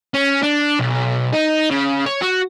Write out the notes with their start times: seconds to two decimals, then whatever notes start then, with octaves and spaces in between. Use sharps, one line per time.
0.14 C#4
0.42 D4
0.79 B1
1.33 D#4
1.71 C#3
2.06 C#5
2.22 F#4